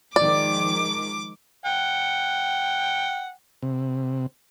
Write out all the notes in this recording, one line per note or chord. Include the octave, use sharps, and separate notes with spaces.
D#3 F3 G#3 D5 D6
F#5 G5
C3